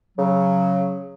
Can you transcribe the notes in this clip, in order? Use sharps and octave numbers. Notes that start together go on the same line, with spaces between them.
C#3 F#3